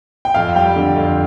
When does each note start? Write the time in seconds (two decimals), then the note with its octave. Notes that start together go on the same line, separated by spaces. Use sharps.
0.25 G5
0.34 F2 F5
0.55 G3 G5
0.76 D3
0.96 F2